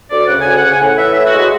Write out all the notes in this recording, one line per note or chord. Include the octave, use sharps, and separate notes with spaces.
D2 D5
C#3 F#5
D2 G#5
F#5
C#3
G#5
A2 F#5
E3 E5
A2 E5
F#4
G#3
F#4